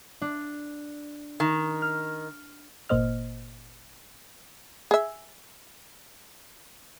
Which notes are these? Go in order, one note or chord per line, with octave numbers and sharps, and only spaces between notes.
D4
D#3
F6
G1 A#2 A#3 C5 D#5 F6
G#4 E5